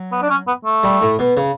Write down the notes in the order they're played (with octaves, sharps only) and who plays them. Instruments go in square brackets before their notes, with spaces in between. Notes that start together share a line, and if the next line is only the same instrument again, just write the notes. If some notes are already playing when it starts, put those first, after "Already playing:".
Already playing: [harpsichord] F#3
[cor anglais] B3
D4
C#4
B3
A3
[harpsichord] G3
A2
B2
C#3